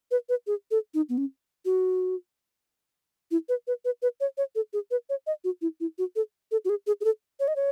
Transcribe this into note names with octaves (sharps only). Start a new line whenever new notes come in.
B4
B4
G#4
A4
D#4
B3
C#4
F#4
E4
B4
B4
B4
B4
C#5
C#5
A4
G#4
B4
C#5
D#5
F#4
E4
E4
F#4
A4
A4
F#4
G#4
G#4
G#4
A4
C#5
D#5
C#5